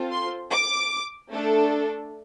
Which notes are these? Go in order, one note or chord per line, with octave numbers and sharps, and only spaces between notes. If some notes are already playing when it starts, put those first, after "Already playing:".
Already playing: C4 F4 A4
C6
D6
A3 D4 A4